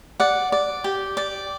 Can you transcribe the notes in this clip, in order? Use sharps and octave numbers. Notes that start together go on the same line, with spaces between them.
D5 F#5
D5
G4
D5